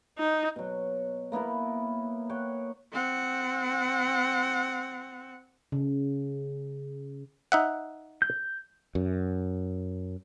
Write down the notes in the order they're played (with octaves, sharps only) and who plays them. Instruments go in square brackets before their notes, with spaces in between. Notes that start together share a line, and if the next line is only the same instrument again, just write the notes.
[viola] D#4
[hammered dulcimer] B2 F#3
A#3 B3 E4 A#4
C#5 F#5 G5
[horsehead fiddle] C4 F#5
[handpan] C#3
[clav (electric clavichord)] D#4 E5 F#5
[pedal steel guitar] G6
[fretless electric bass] F#2